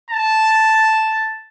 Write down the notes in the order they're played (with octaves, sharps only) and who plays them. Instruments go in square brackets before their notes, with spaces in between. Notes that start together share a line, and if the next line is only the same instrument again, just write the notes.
[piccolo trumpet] A5